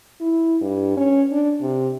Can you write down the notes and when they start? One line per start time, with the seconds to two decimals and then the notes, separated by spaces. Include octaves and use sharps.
0.21 E4
0.61 G2
0.97 C#4
1.31 D4
1.61 C3